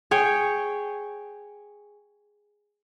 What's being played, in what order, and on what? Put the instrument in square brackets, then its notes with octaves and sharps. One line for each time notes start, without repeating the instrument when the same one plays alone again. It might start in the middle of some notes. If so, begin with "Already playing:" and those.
[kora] G#4 C#5 G5